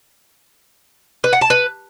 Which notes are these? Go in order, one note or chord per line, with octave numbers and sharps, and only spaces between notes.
B4
F#5
A5
B4